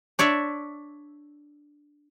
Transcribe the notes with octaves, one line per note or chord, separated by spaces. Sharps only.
D4 C#5 D5 E5